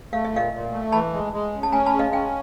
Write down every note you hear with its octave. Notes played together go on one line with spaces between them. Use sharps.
A3 F5
E5
A#2 D#5 F5
A#2
A3
E3 A5 B5
G#3
G#3
C#3
A5
C#4 G#5 A#5
A5 B5
G#3
D#5 F5
C#4 F5 G5